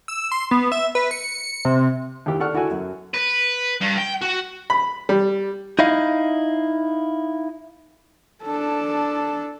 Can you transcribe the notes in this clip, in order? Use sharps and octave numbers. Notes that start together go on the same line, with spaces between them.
E6
C6
B3
E5
B4
C#7
C3
D#2 E4 G4
A4 D5 F#5 C#6 F6
E4 F#4 A4 F#5 G#5
F#2
B4
G2
G5
F#4
B5
G3
D#4 E4 D#5 F5
D4 A4